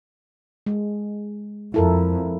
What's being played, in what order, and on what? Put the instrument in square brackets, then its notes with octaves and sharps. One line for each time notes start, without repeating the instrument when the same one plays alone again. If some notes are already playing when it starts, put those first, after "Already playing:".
[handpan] G#3
[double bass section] F2 [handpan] E4 A4 A#4